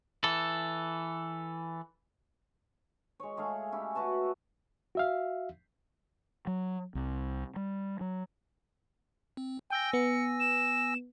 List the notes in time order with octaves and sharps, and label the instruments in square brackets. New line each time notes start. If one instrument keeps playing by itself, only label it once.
[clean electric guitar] E3 A4
[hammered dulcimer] G#3 C#5
G#3 A3 G#4 F5
C#4 E4 G4
F#4 B4 A5
[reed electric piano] F#4 E5 F5
[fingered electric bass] F#3
C2
G3
F#3
[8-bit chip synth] C4
[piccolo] G5 [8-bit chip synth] G#5 E6 A#6
[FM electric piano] B3 [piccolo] C#7
[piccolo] E7